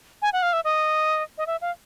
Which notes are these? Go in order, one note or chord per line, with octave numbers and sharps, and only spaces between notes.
G#5
F#5
F5
E5
D#5
D#5
E5
F5